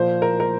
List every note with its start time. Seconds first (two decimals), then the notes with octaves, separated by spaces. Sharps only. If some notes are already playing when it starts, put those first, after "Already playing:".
Already playing: A#2 F3 C5
0.22 A#4
0.40 A#4